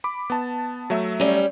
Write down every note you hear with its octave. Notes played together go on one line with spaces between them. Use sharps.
B5 D6
B3 A5
F#3 A3 E5
G3 C#4